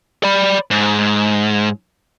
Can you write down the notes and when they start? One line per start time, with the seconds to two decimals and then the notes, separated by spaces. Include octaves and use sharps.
0.24 D5 B5
0.71 G#2